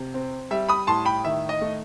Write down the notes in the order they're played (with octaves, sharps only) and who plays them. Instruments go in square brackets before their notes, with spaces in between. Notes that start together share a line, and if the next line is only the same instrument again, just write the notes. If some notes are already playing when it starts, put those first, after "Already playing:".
Already playing: [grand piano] C3
C4
G3 E5
B5 D#6
A2 A5 C6
G5 B5
D#3 E5
D#5
A3